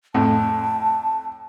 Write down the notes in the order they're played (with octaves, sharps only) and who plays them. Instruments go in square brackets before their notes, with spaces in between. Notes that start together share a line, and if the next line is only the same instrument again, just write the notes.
[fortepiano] F2 A2 [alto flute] A5